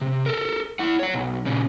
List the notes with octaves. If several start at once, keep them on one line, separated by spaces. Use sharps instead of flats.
C3
A4 A#4
E4 F#5
C#5 F#5
B1
A#2 C#3